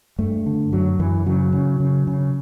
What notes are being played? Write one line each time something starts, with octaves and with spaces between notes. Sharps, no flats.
G2 A3
D3
F#2 F#3
F#2 E3
C#3 F#3
C#3
C#3
C#3